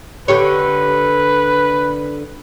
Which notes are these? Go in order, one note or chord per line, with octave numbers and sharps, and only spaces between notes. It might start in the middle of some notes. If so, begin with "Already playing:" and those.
D3 G4 B4 C#5